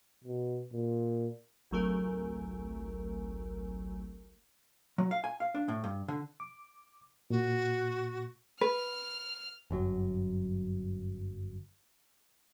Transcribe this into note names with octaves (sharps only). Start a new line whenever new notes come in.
B2
A#2
G#1 C#2 F#3 A3 A#4 G#5
F#3
F5
G#5
F5
D4
A2
G2
D3
D6
A#2 F#4
B4 F6
G1 F#2 F#3